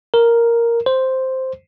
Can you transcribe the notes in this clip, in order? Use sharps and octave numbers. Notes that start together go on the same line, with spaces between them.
A#4
C5